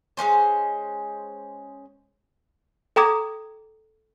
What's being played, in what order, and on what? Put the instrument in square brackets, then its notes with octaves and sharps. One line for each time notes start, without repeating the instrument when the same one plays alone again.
[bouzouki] G#3 A#3 C#4 C5
[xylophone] A4 G5 A#5 D6 D#6 G#6